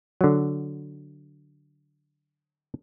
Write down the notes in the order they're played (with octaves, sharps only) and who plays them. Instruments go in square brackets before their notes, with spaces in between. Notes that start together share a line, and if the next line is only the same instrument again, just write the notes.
[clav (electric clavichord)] D3 F#3